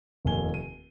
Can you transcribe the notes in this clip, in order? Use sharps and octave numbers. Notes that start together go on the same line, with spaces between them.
F1 D#2 A#3 G#5 G7
D#7